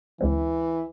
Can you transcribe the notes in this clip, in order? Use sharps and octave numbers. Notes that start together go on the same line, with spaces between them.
D2 E3 G#3 C4